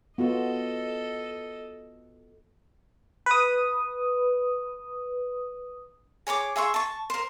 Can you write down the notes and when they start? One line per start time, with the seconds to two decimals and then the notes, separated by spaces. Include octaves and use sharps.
0.18 B3 F4 F#4 A4 D#5
3.26 B4 D#6
6.27 G#4 C#5 C6 D6
6.56 G#4 E5 C6 C#6
6.74 A5 C#6
7.10 A#4 C5